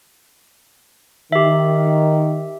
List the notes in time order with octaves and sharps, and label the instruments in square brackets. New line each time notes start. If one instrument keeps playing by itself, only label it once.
[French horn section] D#3 [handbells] G4 E5